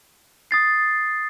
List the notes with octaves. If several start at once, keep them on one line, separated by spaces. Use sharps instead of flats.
D#6 A6 C7